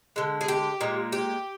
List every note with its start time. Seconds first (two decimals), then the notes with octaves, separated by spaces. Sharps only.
0.16 D3 G#3
0.41 G#4
0.48 G4
0.81 A#2 G#3
1.12 G4